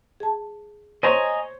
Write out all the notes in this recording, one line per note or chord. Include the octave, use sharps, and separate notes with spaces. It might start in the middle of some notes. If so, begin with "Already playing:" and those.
G#4 A5
C5 C#5 D#5 G#5 A#5